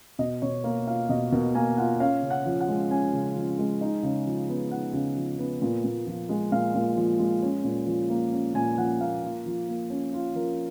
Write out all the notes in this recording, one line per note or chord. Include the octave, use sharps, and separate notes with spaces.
B2 D#5
B2 C#5
A#3
F4 F5
B2 D#5
B2 A#4
A#3 G#5
F4 F#5
C#4 F5
C#3
F#5
F3
F#5
G#3
C#4 G#5
C#3
F3
G#3
D#4
C#3
F3
B3
D#4 F#5
C#3
F3
B3
A#2
A#2
F3
G#3
A#2 F5
A#2
F3
G#3
C#4
A#2
F3
A#3
C#4
A#2 G#5
F3 F#5
A#3 F5
F4
F3
A#3
C#4
F4
F3 A#4